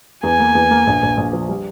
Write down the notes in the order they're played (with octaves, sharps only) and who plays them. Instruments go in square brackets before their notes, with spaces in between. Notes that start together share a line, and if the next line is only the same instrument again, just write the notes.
[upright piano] E2 [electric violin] G#5
[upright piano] A#3
E2
A#3
A#1
A#1
A#1
F3
G3